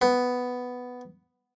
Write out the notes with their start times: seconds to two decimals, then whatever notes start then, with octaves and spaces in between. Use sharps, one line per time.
0.02 B3